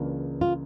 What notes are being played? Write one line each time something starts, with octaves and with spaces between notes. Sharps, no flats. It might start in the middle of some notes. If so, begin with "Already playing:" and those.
Already playing: C#2 C#3 E3 A#3 D4
F4